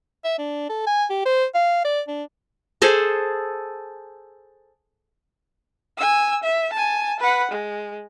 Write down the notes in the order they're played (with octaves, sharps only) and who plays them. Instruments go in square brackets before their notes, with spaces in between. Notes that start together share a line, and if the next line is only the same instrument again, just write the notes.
[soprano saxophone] E5
D4
A4
G#5
G4
C5
F5
D5
D4
[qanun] G#4 A4 C5
[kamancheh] G#5 E6
E5
G#5 A5
B4 F#5
G#3